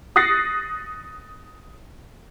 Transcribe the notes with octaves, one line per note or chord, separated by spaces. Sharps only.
D#6 F#6 A6 A#6 C7 C#7